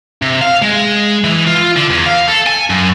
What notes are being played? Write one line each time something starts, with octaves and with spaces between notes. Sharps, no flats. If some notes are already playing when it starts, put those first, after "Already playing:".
C3
F5
G#3
E3
F4
D3
E2
F5
A4
G#5
F#2